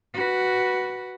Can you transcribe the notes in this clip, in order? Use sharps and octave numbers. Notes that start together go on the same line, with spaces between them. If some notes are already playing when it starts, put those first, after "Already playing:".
F#4 B4